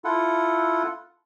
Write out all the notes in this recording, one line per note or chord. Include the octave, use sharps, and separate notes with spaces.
E4 F4 A4 F#5